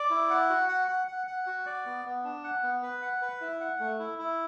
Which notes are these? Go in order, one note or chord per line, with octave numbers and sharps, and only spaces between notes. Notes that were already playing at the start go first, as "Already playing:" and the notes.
Already playing: D5
E4
F#5
F#4
F#5
F#5
F#5
F#5
F#4
D5
B3
B3
D4
F#5
B3
B4
F#5
B4
E4
F#5
A3
E4
E4